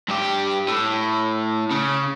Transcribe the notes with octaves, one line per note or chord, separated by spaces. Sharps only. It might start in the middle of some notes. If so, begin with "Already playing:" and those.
G2 G4
A2
C#3